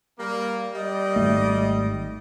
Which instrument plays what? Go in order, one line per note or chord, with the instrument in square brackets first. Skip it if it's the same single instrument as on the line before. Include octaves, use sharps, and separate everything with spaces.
[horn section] G3 A#3
G3 D#5
[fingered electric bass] G#1 A3